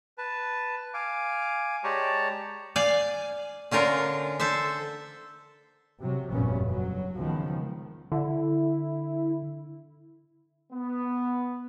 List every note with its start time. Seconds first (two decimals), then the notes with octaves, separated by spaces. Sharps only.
0.18 B4 A5
0.94 F5 G#5 D6
1.84 G#3 G4 C#5 D5 A5 A#5
2.76 D5 F5 G#5
3.71 D3 C#4 F4 A#4
4.40 A4 C5 E5
5.99 C3 F#3
6.31 F1 G2 A#2 C#3 B3 C#4
6.69 F#3
7.16 C#2 D#3 F3 B3
8.12 D3 E4
10.73 B3